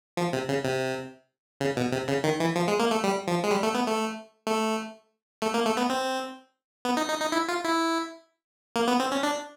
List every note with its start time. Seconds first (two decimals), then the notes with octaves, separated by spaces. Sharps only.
0.17 F3
0.33 C3
0.49 C#3
0.65 C3
1.61 C#3
1.77 B2
1.92 C3
2.08 C#3
2.24 D#3
2.40 E3
2.56 F3
2.68 G#3
2.80 A#3
2.91 A3
3.04 G3
3.27 F3
3.44 G#3
3.51 G3
3.63 A3
3.74 B3
3.87 A3
4.47 A3
5.42 A3
5.54 A#3
5.66 A3
5.77 B3
5.90 C4
6.85 B3
6.97 D#4
7.09 D#4
7.21 D#4
7.32 E4
7.48 F4
7.64 E4
8.76 A#3
8.88 B3
9.00 C4
9.12 C#4
9.23 D4